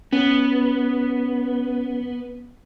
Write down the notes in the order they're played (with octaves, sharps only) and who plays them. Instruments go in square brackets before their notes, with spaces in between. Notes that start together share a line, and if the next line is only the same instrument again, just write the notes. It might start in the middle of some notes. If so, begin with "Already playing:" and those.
[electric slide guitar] B3 [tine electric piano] C#4